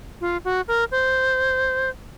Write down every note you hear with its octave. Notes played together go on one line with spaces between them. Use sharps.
F4
F#4
A#4
C5